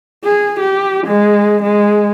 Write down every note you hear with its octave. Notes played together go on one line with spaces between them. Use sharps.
G#4
G4
G#3
G#3